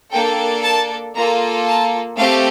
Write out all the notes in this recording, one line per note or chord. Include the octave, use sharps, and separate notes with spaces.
A#3 D4 A4 G5
A5
A#3 F4 A4 A#5
A5
A3 C4 G4 F5